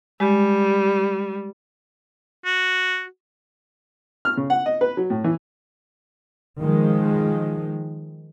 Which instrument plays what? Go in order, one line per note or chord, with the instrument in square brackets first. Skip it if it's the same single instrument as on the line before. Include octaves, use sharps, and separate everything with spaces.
[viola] G3 [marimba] G#3
[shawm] F#4
[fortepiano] F6
C#3
F#5
D#5
B4
F#3
A2
E3
[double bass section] D#3 F3 G#3